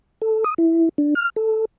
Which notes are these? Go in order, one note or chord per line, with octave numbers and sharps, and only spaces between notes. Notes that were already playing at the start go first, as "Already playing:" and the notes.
A4
D#6
E4
D4
F6
A4